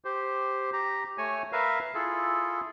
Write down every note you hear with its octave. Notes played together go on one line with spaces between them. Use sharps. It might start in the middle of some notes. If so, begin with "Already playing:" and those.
G4 C5
G4 A#5
A3 C#5 G#5
A#4 B4 E5 F5
E4 F4 G#4 A4